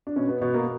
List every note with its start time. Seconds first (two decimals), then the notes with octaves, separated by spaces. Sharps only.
0.07 D4
0.16 B2 C#4
0.29 B3
0.41 B2 B3
0.54 A#3